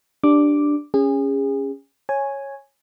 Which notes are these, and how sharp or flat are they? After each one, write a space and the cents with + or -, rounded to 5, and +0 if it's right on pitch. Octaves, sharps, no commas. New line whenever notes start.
D4 +0 G4 +0 D6 +0
C#4 +0 G#4 -30
C#5 -10 G#5 +0